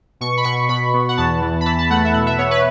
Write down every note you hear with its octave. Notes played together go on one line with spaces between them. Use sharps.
B2 C#6
B5
B2 C#6
B2 B5
B3
F#5
E2 A5
E3
B5
E3 A5
A5
A3 F#5
E5
B2 F#5
E5
B3 C#5
B4